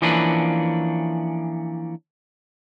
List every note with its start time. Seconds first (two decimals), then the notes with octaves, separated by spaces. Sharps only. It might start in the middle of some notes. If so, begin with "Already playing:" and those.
0.02 E3 F3 A#3 C#4 D4 B4